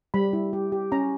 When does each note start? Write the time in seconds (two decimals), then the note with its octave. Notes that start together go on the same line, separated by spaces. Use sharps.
0.14 G3 B5
0.33 E4
0.53 G4
0.72 G4
0.92 C#4 A#5